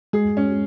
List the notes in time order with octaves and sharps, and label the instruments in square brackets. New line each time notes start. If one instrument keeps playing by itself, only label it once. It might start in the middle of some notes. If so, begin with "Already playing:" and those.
[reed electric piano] G#3 [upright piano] G#4
[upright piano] C#4